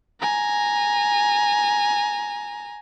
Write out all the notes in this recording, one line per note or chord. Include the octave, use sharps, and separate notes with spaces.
G#5 A#5